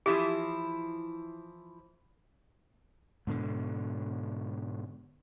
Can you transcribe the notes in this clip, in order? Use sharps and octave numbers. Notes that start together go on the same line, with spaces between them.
E3 F3 E4 G4
G#2 B2 D3